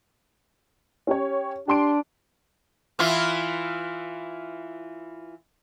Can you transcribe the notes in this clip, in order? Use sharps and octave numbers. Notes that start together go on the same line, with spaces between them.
C#4 G4 C#5
D4 G4 C6 D7
E3 E4 F4